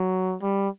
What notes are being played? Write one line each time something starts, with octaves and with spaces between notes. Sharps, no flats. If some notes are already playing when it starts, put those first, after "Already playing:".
Already playing: F#3
G3